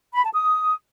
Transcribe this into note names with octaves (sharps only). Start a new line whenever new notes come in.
B5
A5
D#6